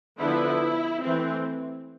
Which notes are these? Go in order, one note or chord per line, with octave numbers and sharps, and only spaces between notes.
D3 F3 B3 D4 E4
E3 A3 C4